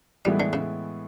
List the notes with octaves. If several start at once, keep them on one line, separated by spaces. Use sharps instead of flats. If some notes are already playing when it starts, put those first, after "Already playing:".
A2 E3 G3 G#3 B3 E4
D3
C#3